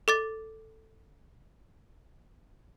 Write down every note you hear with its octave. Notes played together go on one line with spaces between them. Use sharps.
A4 D6 A6